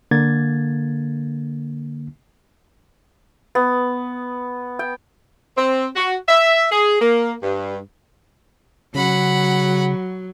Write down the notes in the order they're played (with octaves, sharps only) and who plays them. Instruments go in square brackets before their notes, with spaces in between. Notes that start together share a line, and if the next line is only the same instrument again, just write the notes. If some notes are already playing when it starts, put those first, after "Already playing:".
[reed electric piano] D3 A#3 G#6 A6
[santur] B3
G5
[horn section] C4
F#4
E5
G#4
A#3
G2
[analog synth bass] C#3 [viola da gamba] F#3 [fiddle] F#5 B5